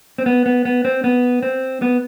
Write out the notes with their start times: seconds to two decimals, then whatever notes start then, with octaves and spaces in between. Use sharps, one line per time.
0.18 C4
0.26 B3
0.46 B3
0.65 B3
0.85 C4
1.04 B3
1.43 C4
1.82 B3